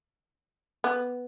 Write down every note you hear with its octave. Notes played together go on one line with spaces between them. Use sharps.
B3